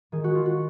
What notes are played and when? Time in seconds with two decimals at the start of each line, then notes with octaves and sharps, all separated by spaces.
0.12 D#3 G#4
0.24 F#4
0.35 F4
0.46 F#4